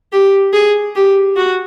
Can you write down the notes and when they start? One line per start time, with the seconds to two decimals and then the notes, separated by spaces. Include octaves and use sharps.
0.12 G4
0.53 G#4
0.96 G4
1.36 F#4